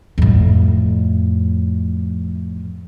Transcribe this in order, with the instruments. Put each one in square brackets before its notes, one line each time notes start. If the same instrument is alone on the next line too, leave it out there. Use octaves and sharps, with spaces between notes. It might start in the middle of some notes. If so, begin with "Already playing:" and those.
[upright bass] F2 A2